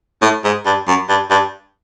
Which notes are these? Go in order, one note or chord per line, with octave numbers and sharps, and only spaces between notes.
A2
G#2
G2
F#2
G2
G2